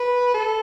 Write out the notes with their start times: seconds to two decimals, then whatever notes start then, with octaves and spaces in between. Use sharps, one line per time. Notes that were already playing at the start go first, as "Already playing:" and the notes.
Already playing: B4
0.34 A4